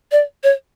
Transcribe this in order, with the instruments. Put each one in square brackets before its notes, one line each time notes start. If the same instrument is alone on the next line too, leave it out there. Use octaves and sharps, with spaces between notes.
[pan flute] D5
C#5